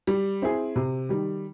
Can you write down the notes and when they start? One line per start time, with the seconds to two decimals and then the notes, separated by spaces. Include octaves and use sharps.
0.07 G3
0.42 C4 E4 G#4
0.76 C3
1.09 D#3 G3